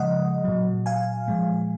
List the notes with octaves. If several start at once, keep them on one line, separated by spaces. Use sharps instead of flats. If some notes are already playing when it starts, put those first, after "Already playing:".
Already playing: C#3 F3 G#3 D#5 F#5
A#2 F#3
F5 G#5
A#2 F3 G#3